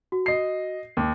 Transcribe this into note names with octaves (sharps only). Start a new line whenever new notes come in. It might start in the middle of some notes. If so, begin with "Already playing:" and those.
F#4
D#5 C7
D#2